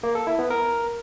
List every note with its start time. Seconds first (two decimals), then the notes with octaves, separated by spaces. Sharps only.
0.03 A#3
0.15 A4
0.27 E4
0.39 B3
0.50 A#4